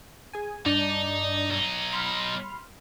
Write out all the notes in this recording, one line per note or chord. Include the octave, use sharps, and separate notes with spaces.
G#4 G#5
G2 D4 D#4 D5
B1 D#4
B5 C6 F6